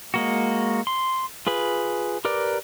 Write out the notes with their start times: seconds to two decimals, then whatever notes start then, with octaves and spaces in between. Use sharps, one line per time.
0.14 G#3 A#3 F#4
0.87 C6
1.47 F4 G#4 B4
2.25 G4 A#4 B4 D5